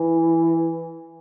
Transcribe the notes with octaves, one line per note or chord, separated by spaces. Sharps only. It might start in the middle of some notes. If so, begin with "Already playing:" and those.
Already playing: E3